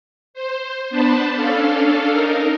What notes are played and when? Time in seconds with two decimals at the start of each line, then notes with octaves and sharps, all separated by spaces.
0.34 C5
0.90 B3 D4 B4 C5 A5
1.35 C#4 D4 A4 F5
2.10 D#4 A#4